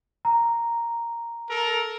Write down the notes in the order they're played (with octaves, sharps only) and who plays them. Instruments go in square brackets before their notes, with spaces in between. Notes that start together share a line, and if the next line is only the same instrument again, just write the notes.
[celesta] A#5
[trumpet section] A4 A#4